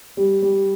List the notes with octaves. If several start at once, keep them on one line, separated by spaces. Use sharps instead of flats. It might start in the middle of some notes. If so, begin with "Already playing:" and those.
G3
G3